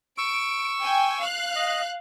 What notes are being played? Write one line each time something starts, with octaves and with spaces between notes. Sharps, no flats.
C#6 E6 D7
G5 G#5
F5 F#6
D#5